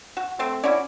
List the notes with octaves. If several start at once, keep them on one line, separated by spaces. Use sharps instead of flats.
F#4
A3 C4 C6
C#4 E4 F#4 D5